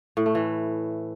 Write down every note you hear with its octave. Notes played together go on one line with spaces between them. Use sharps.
A2
A3
E3